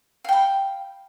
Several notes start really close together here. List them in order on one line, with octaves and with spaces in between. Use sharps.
F5 G5 B5